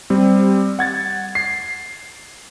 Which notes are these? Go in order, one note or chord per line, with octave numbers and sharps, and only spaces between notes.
G3 C4
F#5 G#6 A6
C7